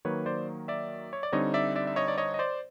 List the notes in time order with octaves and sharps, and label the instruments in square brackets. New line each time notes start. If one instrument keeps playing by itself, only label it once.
[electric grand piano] D#3 F#3 A#3 B4 C#5
C5 D5
D5 E5
C#5
D5
D3 G3 C4 D#4 C#5 D#5
D5 E5
D5 E5
E5
C#5 D#5
D5
C#5 D#5
D#5
C5 D5